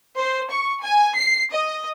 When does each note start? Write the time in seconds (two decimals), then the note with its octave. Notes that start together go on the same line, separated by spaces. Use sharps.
0.17 C5
0.50 C#6
0.82 G#5
1.15 C7
1.53 D#5